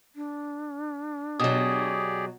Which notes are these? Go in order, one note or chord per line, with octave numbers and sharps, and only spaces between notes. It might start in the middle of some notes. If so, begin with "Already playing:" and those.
D4
B2 F#3 G4 G#4 D5 D#6